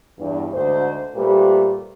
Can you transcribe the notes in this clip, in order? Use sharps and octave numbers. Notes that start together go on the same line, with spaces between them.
E2 G2
D2 G#2 C5
A#2 G3 A3 G4 B4 C5